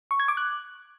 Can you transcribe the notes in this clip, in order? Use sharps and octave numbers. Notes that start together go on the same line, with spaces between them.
C#6
G#6
D6
F#6